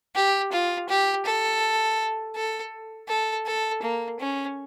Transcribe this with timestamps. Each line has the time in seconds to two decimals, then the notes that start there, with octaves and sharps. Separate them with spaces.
0.15 G4
0.52 F4
0.89 G4
1.25 A4
2.35 A4
3.08 A4
3.46 A4
3.82 A#3
4.19 C#4